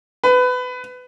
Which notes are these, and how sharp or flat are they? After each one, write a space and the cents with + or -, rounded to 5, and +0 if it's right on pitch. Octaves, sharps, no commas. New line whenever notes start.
B4 +20